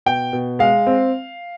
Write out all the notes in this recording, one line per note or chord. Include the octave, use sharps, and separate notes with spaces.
B2 G5
B2
G#3 F5
C4